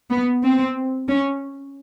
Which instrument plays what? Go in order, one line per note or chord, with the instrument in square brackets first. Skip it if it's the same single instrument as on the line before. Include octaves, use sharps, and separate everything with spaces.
[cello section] B3
C4
C#4